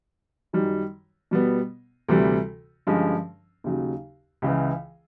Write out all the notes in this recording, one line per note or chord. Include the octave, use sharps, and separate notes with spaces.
F#2 D#3 G3
B2 G3 B3
D2 C3 E3 G3
G2 D3 F3 G#3 C#4
D#2 C#3 F#3
C#2 C#3 E3